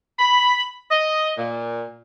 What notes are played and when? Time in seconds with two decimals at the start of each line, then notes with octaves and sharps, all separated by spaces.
0.19 B5
0.91 D#5
1.38 A#2